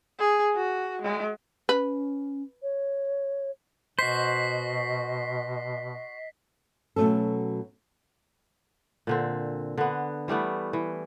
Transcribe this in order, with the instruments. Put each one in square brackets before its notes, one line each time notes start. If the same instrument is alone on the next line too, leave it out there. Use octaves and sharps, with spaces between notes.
[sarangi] G#4
F#4
G#3
[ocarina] C#4 [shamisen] B4
[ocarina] C#5
[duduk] B2 [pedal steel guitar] F#4 C5 [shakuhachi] D#5 [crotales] B6 C7
[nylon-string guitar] B2 F#3 A3 C#4 A4
[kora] A#2 D3 C4
D3 B3
E3 G3 A3 B3
E3